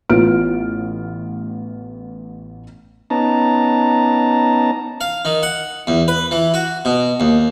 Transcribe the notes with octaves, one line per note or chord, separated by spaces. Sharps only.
A1 A2 B3 F4 F6 D7
B3 C#4 D#4 A5 A#5
F5
D#3
F#5
E2
B4
E3
F#4
B2
D#2